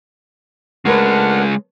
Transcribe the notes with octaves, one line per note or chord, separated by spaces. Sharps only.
C#3 G#3 A3 D4 A#4 B4 F#5 F6